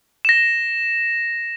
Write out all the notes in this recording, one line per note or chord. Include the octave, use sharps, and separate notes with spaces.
A#6 E7